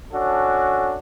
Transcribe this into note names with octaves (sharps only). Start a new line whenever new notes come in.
C#4 D4 F#4 A4